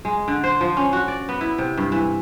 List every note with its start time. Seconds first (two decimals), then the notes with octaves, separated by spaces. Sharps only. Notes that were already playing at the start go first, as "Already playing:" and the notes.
0.05 G#3
0.28 D3
0.44 C5
0.61 F3
0.77 C#4
0.93 F#4
1.08 D5
1.29 B3
1.41 E4
1.58 C3
1.78 G2
1.92 E3